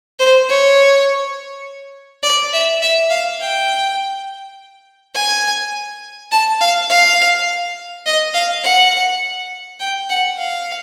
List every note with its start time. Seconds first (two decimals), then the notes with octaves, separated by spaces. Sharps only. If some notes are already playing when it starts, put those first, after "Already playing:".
0.19 C5
0.49 C#5
2.23 D5
2.53 E5
2.82 E5
3.10 F5
3.41 G5
5.15 G#5
6.32 A5
6.61 F5
6.90 F5
8.06 D#5
8.34 F5
8.64 F#5
9.80 G5
10.10 F#5
10.39 F5